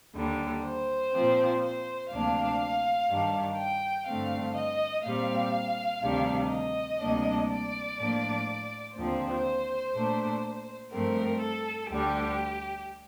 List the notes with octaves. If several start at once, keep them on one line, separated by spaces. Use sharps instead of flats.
D#2 D3 G3
C5
A#2 F3 C4
C5
D2 C3 F3 A#3 D4 F5
G2 D#3 G3 D4
G5
G2 D3 A3 C4 F5
D#5
A#2 G3 C4 F5
D2 C3 D#3 G3 D4
D#5
D2 C3 G3 A#3 D4
D5
A2 F3 A#3 D4
D#2 D3 F3 C4 C5
A#2 A3 D4
G2 F3 A3 C4 A#4
A4
D2 D3 G3 G4